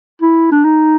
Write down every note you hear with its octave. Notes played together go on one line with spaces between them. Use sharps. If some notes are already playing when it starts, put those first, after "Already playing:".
E4
D4
D#4